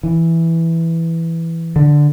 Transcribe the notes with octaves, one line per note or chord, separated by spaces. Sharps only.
E3
D3